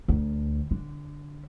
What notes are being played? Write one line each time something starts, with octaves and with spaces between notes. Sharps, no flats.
D2
D3